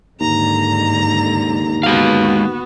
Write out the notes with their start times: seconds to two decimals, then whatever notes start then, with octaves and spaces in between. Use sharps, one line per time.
0.20 D#2 G#2 D3 A#5
1.83 G#3 B3 F#4 F5